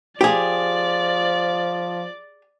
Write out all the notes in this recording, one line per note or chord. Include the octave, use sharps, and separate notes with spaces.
F3 G4 G#4 D5